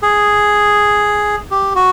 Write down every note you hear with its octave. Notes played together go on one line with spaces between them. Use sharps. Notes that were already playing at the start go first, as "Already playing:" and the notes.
G#4
G4
F#4